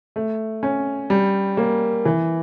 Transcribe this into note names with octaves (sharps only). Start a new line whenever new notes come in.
A3
C#4
G3
A#3
E3